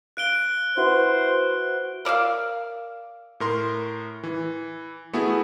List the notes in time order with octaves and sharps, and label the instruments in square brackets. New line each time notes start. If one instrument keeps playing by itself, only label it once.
[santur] F5 [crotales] F#6 D7 G7
[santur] E4 F#4 B4 [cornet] C5
[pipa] A#4 D5 E5 F5
[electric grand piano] A2 A#4 C6
E3
A3 B3 E4 F#4 G#4